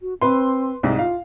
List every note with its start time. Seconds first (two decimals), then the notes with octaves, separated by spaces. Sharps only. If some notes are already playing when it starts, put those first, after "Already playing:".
0.01 F#4
0.22 C4 B4 C6
0.83 C2 G#2
0.99 F4 F5